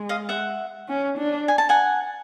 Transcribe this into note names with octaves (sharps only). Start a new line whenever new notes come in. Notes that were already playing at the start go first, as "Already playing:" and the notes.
Already playing: G#3
D#5 F5
E5 F#5
C#4
D4
G#5
A5
F#5 G#5